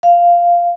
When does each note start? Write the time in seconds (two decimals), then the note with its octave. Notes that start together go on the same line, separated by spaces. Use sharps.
0.03 F5